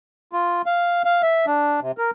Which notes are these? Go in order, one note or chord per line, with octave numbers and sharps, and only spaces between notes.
F4
F5
F5
E5
D4
C3
A#4